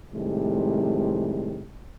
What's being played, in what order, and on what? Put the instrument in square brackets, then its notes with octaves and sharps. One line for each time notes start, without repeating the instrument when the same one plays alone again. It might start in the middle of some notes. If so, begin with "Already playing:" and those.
[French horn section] A2 C3 D#3 F3 G3 G#3